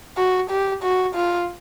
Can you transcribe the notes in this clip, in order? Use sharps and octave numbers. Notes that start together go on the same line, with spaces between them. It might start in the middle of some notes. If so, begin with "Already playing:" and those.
F#4
G4
F#4
F4